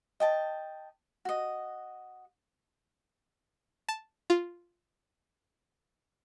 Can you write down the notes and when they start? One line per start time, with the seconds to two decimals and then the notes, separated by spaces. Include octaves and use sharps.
0.20 D#5 G5 A5
1.25 F#4 D#5
3.89 A5
4.30 F4